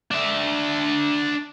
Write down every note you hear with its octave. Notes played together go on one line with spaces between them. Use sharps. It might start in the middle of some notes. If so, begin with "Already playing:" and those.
D4 E5